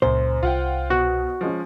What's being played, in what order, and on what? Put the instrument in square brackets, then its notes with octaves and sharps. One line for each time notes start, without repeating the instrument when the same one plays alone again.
[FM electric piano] C#2 A#2 [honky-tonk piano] F#2 [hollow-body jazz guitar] C5
[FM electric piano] C2 [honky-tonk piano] F4 F#5 G5
[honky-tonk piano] B2 [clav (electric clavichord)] F#4
[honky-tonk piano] F3 G#3 C#4